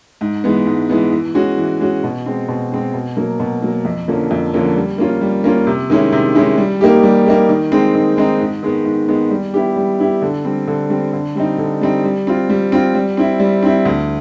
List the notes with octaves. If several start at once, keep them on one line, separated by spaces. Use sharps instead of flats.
G#2
E3 G#3 B3
G#2
E3 G#3 B3
E3
G#3 C#4 F#4
E3
G#3 C#4 F#4
B2
G#3 C4
B2
G#3 C4
B2
F#3 A#3
B2
F#3 A#3
F2
D3 F3 A#3 C#4
F2
D3 F3 A#3 C#4
G3
A#3 C#4 F4
G3
A#3 C#4 F4
C3
D#3 G#3 C#4 E4
C3
D#3 G#3 C#4 E4
G3
A#3 D#4 G4
G3
A#3 D#4 G4
D#3
G#3 C4 D#4
D#3
G#3 C4 D#4
G#2
D#3 G#3 B3
G#2
D#3 G#3 B3
G3
B3 E4 G4
G3
B3 E4 G4
D3
G3 C4
D3
G3 C4
D3
G3 C4 D#4
D3
G3 C4 D#4
G3
C4 F4
G3
C4 F4
G3
C4 E4
G3
C4 E4
D2